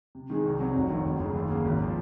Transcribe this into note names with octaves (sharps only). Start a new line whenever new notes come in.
C3
D#3 G#3 D#4 G#4
C2
C3 F#3 C4
F1
D#2 D#3 F#3
F#1
F#2 C#3
D#2
C#3 F#3 A#3
G#1
F3